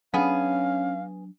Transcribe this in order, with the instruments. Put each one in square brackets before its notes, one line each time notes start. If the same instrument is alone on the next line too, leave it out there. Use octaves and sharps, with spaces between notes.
[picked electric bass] F#3 D4 [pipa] B3 G#4 [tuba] C#4 [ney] F5